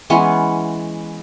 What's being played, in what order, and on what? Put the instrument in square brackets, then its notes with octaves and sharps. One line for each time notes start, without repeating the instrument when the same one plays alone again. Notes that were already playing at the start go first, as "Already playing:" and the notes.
[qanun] E3 G#3 B3 C#4